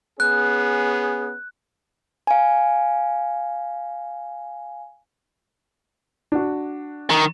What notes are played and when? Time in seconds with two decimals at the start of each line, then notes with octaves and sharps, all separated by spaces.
0.20 B3 C#4 G#4 F#6
2.27 F5 G#5
6.32 D4 F#4
7.10 D#3